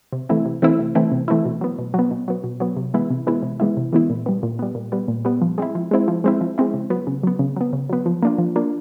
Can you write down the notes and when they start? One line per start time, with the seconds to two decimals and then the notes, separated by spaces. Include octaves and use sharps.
0.13 C3
0.29 E3 A3 C4 E4
0.45 C3
0.62 E3 A3 C4 E4
0.79 C3
0.95 E3 A3 C4 E4
1.12 C3
1.28 E3 A3 C4 E4
1.45 B2
1.61 F#3 B3
1.78 B2
1.94 F#3 B3
2.11 B2
2.28 F#3 B3
2.44 B2
2.60 F#3 B3
2.76 C3
2.94 E3 G#3 B3 E4
3.10 C3
3.27 E3 G#3 B3 E4
3.43 C3
3.60 E3 G#3 B3 E4
3.77 C3
3.93 E3 G#3 B3 E4
4.10 A#2
4.26 G3 B3
4.43 A#2
4.59 G3 B3
4.75 A#2
4.92 G3 B3
5.08 A#2
5.25 G3 B3
5.42 F3
5.58 G#3 C4 E4
5.75 F3
5.91 G#3 C4 E4
6.08 F3
6.24 G#3 C4 E4
6.41 F3
6.58 G#3 C4 E4
6.74 C#3
6.90 F#3 B3
7.07 C#3
7.23 F#3 B3
7.39 C#3
7.56 F#3 B3
7.73 C#3
7.90 F#3 B3
8.06 F3
8.23 A#3 D4 F4
8.38 F3
8.56 A#3 D4 F4